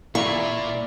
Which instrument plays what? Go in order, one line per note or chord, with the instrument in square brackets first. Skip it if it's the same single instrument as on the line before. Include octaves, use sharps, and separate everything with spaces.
[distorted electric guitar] A#2 [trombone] E4 [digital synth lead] D5 [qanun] C#6